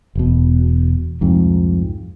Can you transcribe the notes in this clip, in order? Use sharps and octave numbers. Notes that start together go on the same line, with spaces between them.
E1 B2
C2 F2 G#2